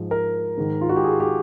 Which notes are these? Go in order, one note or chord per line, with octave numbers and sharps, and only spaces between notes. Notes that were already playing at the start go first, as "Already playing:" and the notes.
Already playing: G#2 F3
A#4
G#2 D#3
F4
F#4
G4
G#4
G4